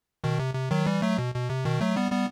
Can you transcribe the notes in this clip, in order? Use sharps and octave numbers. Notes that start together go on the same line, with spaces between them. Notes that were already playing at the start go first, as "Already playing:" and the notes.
B2 D#3
C3
C3
D#3 F#3
E3 G3
F#3 A3
B2
B2
C3
B2 D#3
F#3 A3
G3 B3
G3 B3